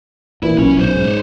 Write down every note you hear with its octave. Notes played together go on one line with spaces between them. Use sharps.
A#2 E3 E4
B1 C#4
B1 C5 C#5
G#2